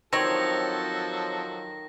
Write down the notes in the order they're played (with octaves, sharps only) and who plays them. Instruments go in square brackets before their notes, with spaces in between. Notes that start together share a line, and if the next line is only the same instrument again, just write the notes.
[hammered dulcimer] D#3 [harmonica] F3 F#3 A4 [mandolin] C4 C#5 [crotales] A#6